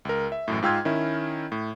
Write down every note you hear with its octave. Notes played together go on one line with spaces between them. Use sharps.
C#2 A#4
E5
A1 F#2 A2
G#2 F4 G5 E6 F6 G#6
D#3 C#4 E4
A2